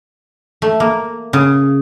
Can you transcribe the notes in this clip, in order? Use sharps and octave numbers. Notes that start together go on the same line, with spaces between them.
A3
A#3
C#3